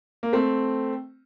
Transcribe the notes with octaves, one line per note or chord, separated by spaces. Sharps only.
A#3
A3 C4